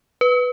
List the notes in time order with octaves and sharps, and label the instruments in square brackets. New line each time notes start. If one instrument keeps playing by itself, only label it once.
[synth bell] B4